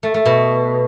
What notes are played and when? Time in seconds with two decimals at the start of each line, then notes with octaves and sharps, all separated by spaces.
0.03 A3
0.14 A3
0.25 B2